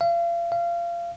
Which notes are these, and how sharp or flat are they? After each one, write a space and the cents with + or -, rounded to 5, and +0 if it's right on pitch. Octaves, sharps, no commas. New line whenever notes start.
F5 -35
F5 -25